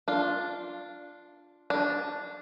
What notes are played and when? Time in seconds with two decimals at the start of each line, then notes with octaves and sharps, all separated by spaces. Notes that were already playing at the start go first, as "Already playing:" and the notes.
0.08 D4 F4
1.70 D4